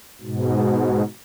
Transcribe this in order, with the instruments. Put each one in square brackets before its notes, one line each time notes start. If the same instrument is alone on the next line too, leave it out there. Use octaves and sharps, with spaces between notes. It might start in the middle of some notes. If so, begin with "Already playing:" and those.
[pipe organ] G#2 B2